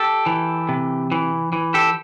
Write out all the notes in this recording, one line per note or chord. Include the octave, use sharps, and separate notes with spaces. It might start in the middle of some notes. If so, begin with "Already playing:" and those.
Already playing: G4 A4
E3
C3
E3
E3
G4 A4